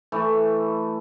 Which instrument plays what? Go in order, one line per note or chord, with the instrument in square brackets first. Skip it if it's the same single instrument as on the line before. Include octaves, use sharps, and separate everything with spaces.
[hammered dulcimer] E3 A3